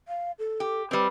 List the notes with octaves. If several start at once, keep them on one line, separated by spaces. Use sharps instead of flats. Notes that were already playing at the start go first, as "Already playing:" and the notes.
F5
A4
G4
G3 C4 B4